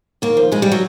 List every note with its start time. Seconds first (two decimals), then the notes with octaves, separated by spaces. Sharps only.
0.22 D#2 A#3
0.37 F3
0.52 C#3 G#3
0.62 G3
0.72 F#3